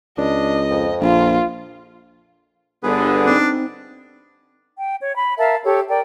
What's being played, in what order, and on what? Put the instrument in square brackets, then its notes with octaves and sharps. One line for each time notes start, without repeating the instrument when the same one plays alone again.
[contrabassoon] C#2 [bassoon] D4 [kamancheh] D#5
[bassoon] F2
[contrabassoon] A#1 [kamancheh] F4
[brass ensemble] G1 D3 [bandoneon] B3 G#4 B4
[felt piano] C4 D#4 [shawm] D4
[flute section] G5
C#5
B5
A#4 E5 F5 A5
G4 A4 C#5
A#4 D5 G5